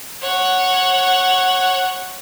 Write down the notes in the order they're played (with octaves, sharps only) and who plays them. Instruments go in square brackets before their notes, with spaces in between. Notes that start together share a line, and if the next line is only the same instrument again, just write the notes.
[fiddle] C#5 F#5